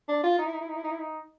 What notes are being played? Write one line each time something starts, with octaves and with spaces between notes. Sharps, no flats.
D4
F4
D#4
E4
D#4
E4
D#4
E4
D#4
E4
D#4